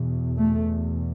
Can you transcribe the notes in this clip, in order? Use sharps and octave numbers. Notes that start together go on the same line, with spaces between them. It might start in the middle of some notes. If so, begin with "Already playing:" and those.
Already playing: E2 B2
A3